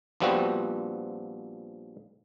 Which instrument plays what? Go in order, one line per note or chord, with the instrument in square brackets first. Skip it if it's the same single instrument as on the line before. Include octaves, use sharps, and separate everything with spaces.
[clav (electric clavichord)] A#1 F3 G3 B3 C4 F#4